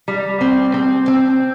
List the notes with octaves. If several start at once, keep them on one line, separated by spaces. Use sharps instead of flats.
G3
C4
C4
C4